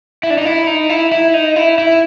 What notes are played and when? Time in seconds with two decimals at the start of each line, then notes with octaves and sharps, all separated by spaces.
0.23 E4
0.30 D4
0.38 D#4
0.45 E4
0.67 D#4
0.89 E4
1.12 E4
1.34 D#4
1.56 E4
1.78 E4